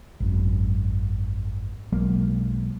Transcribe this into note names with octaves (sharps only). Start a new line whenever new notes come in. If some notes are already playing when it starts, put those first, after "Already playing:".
G#1 F#2
B1 F#3 G#3 A#3